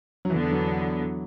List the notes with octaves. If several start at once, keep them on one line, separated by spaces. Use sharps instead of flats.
F#3
E2 D3 E3 B3
F#3